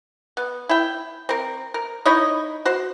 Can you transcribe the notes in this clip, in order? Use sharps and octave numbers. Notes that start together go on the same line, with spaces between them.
B3
E4 G5
C4 A#4
A#4
D#4 E4 C#5 D#5
F#4 C5